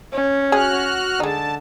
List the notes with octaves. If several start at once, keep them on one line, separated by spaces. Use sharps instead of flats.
C#4
F#4 G#4 F6 F#6
D3 G#3 D#4 A5